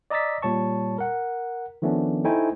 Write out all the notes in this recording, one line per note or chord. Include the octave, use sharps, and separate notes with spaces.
D5 D#5 A#5 E6 A6 B6
A#2 G3 C#5 A5 C#6
A#4 F#5
D#3 F3 A3 B3 C#4 D4
A3 D#4 E4 C5 G5 G#5